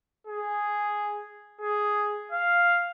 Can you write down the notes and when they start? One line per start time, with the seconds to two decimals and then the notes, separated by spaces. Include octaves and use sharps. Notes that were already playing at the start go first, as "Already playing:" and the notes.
0.27 G#4
1.61 G#4
2.32 F5